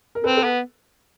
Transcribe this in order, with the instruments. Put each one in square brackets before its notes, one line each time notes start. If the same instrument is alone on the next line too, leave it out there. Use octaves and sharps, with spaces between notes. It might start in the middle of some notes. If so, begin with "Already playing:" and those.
[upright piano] A#4
[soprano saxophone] C4 [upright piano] A4 B4
[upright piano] A4 B4
[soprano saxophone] B3